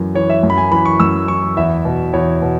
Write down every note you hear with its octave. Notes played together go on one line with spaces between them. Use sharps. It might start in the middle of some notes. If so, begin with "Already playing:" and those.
Already playing: F#2 E3
E3 C#5
E5
F#2
B5
G#5
E3 B5
C#6
F#2 E6
E3 C#6
E2 E5
B2
E2 C#5
B2